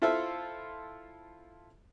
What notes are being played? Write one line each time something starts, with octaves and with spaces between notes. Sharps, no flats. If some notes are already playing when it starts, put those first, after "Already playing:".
E4 F4 A4 C5 E5 F5